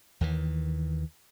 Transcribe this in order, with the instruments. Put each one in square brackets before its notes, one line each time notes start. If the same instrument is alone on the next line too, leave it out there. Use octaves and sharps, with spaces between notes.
[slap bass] D#2 D#3 E3